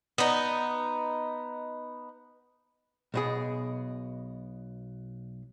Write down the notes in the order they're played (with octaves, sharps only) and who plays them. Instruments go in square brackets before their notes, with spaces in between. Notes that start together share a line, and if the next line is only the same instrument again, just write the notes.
[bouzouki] B3 D#4
[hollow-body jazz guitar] B1 B2 G#4